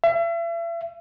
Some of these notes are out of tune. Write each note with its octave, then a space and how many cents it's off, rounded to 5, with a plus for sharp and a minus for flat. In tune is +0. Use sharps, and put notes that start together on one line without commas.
E5 +40